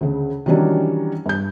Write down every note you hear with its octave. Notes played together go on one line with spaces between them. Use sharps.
D2 C#3
D#3 E3 F#3 G3 C#4 D4
G2 G6